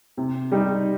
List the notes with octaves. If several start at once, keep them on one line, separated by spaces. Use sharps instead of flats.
C3
G3 D#4